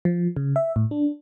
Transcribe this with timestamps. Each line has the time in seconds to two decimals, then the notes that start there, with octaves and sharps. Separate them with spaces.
0.05 F3
0.37 C#3
0.56 E5
0.76 A2
0.91 D4